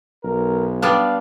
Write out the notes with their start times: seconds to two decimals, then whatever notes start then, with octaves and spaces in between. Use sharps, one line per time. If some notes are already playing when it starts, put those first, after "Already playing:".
0.24 B1 A#4
0.82 G3 B3 D4 F5